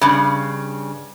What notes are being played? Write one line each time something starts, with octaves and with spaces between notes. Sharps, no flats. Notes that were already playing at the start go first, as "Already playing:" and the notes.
G2 C#3